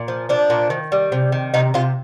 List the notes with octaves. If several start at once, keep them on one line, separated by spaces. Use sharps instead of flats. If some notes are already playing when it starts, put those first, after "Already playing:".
Already playing: A#2
F3
F3 D4
A#2
D#3
G3
C3
D#3
C3 D#4
C3 F4